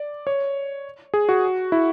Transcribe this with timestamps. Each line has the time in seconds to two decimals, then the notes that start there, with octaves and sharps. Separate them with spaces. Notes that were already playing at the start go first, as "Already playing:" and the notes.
Already playing: D5
0.27 C#5
1.14 G#4
1.29 F#4
1.72 E4